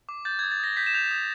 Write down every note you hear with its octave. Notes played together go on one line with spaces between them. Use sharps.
D6
G6 A6
D#6 G#6
A6
D#6 A#6
G6 B6
E7
G6 F7
D#6